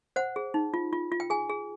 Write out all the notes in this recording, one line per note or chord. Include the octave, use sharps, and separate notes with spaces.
C5 F#5
G#4
D#4
F4
F4
F4
G5
G#4 G#5
G#4